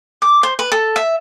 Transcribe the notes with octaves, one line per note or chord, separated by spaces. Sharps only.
D6
C5
B4
A4
E5